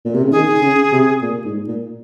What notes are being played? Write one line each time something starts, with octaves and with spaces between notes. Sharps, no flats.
A#2
C3
C#3
D#3 G#4
C#3
C3
A#2
G#2
A#2